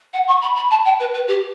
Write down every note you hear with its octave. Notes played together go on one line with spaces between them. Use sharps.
F#5
C#6
B5
B5
A5
G5
B4
B4
G4